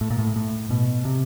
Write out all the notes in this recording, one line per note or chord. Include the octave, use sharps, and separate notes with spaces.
A2
A#2
A2
A2
B2
C3